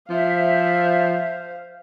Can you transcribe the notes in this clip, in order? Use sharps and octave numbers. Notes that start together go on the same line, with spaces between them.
F3 C5 E5 F5